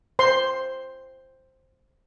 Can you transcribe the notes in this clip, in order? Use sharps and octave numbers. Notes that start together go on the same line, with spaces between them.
C5 C6